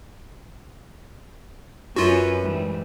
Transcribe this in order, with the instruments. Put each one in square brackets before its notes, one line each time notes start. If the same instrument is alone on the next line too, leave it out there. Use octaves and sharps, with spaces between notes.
[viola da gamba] F#2 C#4 B4 [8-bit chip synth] F4 F#4
[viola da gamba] G#2 E3 G3